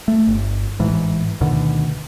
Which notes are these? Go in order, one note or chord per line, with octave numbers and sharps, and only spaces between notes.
A3
G1
A1 G#2 E3
D2 B2 D3 D#3